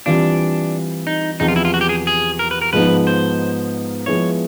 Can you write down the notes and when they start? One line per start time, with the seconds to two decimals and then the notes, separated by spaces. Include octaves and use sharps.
0.06 E3 G3 C4 D4 F4
1.07 D#4
1.40 E2 C3 F3 D#4
1.48 F4
1.56 E4
1.65 F4
1.74 F#4
1.81 G4
1.89 G#4
2.07 G#4
2.39 A#4
2.51 B4
2.62 A#4
2.73 G#2 F3 G#3 B3 D#4 B4
3.07 C5
4.06 F3 G#3 B3 E4 C#5